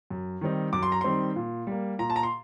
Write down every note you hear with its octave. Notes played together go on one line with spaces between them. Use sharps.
F#2
D#3 G3 C4 D#4
F#2 D6
C6
A#5
D#3 G3 C4 D#4 C6
A#2
G3 A#3
A#2 A#5
A5
A#5
C6